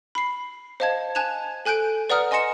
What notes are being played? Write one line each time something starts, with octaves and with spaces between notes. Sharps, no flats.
B5 C7
C5 D#5 F5 A5 G#6
G#5 A5 F#6 G#6 E7 F7
A4 G#5 F#6 G6 D7
B4 D5 F#5 A#5 D#6 F6
D#5 G#5 C6 A#6 C#7 E7